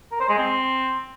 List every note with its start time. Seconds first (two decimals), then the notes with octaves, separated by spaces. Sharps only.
0.12 A#4
0.20 C5
0.29 G#3
0.38 C4